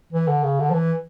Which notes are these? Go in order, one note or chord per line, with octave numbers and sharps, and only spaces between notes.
E3
D3
C#3
D3
F3
E3